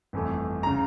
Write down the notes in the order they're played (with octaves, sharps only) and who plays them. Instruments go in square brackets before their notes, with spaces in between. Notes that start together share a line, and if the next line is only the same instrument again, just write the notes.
[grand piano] G1 F2 E3 A3
C#3 A#5